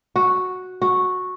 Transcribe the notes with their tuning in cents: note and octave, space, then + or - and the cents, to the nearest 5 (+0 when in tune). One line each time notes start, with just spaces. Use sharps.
F#4 -5
F#4 -10